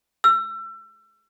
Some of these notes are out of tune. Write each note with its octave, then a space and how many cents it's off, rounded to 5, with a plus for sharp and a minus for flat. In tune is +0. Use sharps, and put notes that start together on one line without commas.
E6 +30